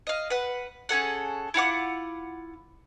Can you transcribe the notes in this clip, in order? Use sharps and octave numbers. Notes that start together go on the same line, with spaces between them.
D#5 F5
B4 F#5
C#4 G#4 A4 F#5
E4 F4 F#5 D6